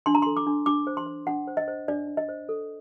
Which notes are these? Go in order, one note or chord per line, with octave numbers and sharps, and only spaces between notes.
D4 C6
A#5
A4 C6
D6
D4
D4 D6
C5
C6
C5
D4 F#5
C5
D#5
C5
D4 D5
D4
D#5
C5
A4